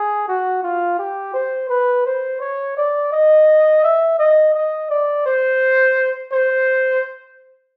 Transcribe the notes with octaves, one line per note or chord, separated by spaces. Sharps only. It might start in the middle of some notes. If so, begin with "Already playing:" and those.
Already playing: G#4
F#4
F4
G4
C5
B4
C5
C#5
D5
D#5
E5
D#5
D#5
D5
C5
C5